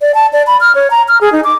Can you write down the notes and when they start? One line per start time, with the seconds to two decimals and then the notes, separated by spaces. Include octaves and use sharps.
0.01 D5
0.15 A5
0.33 D5
0.47 B5
0.60 F6
0.75 C#5
0.91 A#5
1.08 F6
1.21 G#4
1.32 D#4
1.44 D6